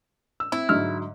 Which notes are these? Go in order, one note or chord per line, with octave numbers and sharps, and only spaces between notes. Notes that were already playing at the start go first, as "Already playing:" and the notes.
E6
C4 E4
G#2 D3 F#3 E6 F6